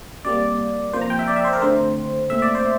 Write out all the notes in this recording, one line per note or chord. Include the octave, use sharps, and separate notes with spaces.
C3 G3 A#3 D5
C3 F3 A#3 C5
A#5
G5
E5
D5
E5
C5
A#4
D3 A3 C4 C5
A#2 A3 C4 E5
D5
C5